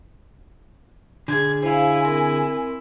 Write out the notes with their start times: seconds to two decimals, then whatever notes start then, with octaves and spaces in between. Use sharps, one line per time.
1.28 D3 G#4 G#6
1.63 E4 C5 F5 G#5
2.03 C4 A#4